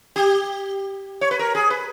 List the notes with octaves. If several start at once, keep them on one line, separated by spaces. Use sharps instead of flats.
G4
C#5
B4
A#4
G#4
B4